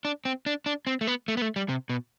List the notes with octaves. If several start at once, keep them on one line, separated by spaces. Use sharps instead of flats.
D4
C4
D4
D4
C4
A3
B3
A3
B3
A3
G3
C3
B2